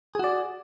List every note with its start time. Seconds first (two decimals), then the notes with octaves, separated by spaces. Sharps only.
0.15 G#4
0.19 F#4
0.24 D5